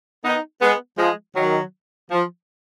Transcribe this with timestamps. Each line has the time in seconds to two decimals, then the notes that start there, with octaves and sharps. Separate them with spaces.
0.24 B3 D#4
0.62 G#3 B3
0.98 F3 G#3
1.36 D#3 F#3
2.10 F3